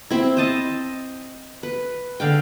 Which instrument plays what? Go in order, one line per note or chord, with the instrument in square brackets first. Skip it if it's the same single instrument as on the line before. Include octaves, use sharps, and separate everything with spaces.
[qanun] C4 E4
C5 D#5 A5
B4
D3 F5 G5